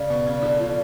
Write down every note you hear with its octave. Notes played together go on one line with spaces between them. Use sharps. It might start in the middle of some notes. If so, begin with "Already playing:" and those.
Already playing: C#3 D5
B2
C#3
D3
F3